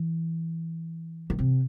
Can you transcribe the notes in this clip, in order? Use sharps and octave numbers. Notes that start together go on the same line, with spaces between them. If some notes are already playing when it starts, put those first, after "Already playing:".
Already playing: E3
D#3
C3